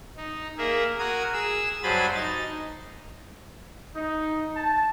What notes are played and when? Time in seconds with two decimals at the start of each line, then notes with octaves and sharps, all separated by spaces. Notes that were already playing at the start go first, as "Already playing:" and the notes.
0.17 D#4
0.58 A#3 G#4 A#4 E5
0.99 F#4 A#4 D#6 G#6
1.33 G#4 E6
1.83 G2 F#3 C5 G#5 B5 A6
2.15 D#4 A6
3.95 D#4
4.56 A5